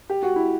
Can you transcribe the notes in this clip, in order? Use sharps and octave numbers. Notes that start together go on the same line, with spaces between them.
G4
F#4
E4